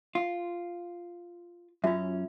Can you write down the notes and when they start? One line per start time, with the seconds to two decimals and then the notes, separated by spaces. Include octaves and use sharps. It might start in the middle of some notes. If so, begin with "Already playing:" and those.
0.15 F4
1.84 F#2 C#4 F4 F#4 E5